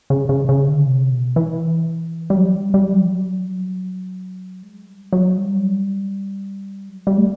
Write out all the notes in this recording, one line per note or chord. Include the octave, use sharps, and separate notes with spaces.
C#3
C#3
C#3
D3
C3
B2
E3
G3
F#3
G3
G3
F#3
F3
F#3
G#3
G3
F#3
G3
F#3
G3
A3